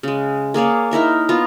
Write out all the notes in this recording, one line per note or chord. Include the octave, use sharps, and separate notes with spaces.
C#3 G#3
A#3 G#4 C#5 D5
D#4 E4 A#4 E5
B3 F4 A#5